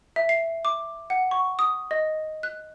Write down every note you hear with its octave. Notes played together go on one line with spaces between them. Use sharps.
E5
C7
D6
F#5
C#6
D#6
D#5
F#6